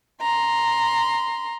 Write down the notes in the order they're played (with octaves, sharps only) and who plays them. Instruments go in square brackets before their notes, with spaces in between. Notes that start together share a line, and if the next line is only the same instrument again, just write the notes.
[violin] A#5 C6